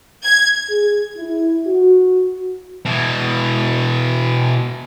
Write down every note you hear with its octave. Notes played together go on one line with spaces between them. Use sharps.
G#6
G#4
E4
F#4
B2 E3